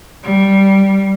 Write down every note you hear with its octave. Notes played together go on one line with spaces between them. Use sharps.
G3